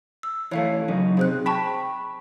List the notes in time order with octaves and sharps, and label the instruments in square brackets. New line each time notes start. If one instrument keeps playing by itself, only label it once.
[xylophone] E6
[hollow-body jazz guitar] E3 A3 [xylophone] C#5 F5
[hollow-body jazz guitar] F#2 C#3 D#4
[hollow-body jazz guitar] C3 [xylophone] G#4 C5 F#6
[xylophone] G5 A5 C#6 [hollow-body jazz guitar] B5